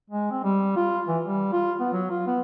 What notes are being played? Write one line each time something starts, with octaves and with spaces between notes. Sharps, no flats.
G#3
C4
G3
F4
E3
G3
F4
B3
F#3
F4
B3